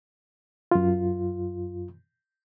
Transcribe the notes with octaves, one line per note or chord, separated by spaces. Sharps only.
F#2 F4